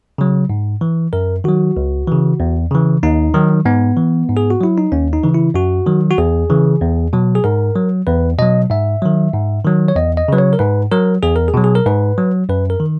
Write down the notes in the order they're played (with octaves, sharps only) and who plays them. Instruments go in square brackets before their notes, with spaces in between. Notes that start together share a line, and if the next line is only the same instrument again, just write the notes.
[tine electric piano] C#3 F#3
G#2
E3
F#2 A#4
D#3 F#3 F#4
C#2
C#3 E3
E2
C#3 E3
D#2 D#4
D#3 F#3
G#2 B3
E3
G#2
G#4
F#4
F#3 E4
D#4
D#2 C#4
D#4
C#3 E3
E4
F#2 F#4
D#3 F#3
F#4
E2 G#4
C#3 E3
E2
B2 F#3
G#4
G#2 A#4
F#3
E2 B4
B2 F#3 D#5
G#2 E5
D#3 F#3
G#2
D#3 F#3
C#5
E2 D#5
D#5
C#3 F#3 B4
C#5
A#4
G#2 B4
F#3 A#4
E2 G#4
A#4
G#4
B2 F#3
G#4
A#4
G#2 B4
F#3
F#2 B4
A#4
D#3